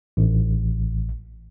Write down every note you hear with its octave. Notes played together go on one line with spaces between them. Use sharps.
A1